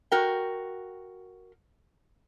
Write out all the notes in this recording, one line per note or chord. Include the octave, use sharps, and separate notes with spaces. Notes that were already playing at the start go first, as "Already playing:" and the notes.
F#4 A#4 G5